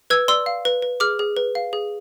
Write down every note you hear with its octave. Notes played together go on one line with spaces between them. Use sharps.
B4 E6 G#6
D5 C6 E6
F5
B4
B4
G#4 D6 F6
G#4
B4
F5
G#4